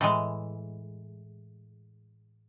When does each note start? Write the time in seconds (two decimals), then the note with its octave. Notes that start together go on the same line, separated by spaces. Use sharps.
0.01 A2 E3 G#3